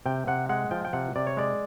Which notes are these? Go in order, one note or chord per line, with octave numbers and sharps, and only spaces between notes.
C3 G5
C3 F#5
G#3 F#5
F3 G5
G5
C3 F#5
C3 D5
C#5
G#3 D5